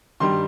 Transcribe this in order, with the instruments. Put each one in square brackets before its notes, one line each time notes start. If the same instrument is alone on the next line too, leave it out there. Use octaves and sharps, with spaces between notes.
[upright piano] G2 D#3 G3 C6